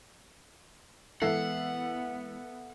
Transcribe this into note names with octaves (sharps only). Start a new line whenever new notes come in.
E3 G#3 B3 E4 A4 E5 F#5 C7